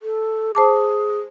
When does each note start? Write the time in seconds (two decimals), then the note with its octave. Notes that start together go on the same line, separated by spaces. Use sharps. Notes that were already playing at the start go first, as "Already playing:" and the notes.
0.02 A4
0.55 G#4 C5 A5 D6